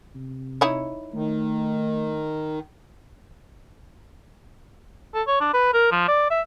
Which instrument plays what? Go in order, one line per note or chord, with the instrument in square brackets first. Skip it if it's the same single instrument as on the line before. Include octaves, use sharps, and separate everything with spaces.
[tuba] C3
[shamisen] D#4 E4 C#5
[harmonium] D#3 [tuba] A3
[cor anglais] A4
C#5
D4
B4
A#4
F3
D5
E5